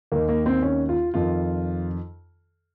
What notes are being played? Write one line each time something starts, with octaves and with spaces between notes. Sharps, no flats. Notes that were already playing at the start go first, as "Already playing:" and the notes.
D#2 D#3 A#3
A#3
C4
C#4
F4
F2 D#3 F4